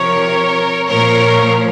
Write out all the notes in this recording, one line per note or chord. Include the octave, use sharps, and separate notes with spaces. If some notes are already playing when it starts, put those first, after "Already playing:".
Already playing: C3 F3 A#4 C#5
A#2 F3 A#4 C#5